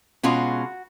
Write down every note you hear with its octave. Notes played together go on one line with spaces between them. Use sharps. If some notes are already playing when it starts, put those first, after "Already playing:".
B2 G#3 C#4 F4 F#4